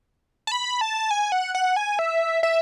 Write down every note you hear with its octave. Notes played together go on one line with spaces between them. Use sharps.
A5
B5
A5
G#5
F#5
F#5
G#5
E5
E5